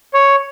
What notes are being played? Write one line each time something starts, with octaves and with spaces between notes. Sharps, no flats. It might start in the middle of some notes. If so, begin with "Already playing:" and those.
C#5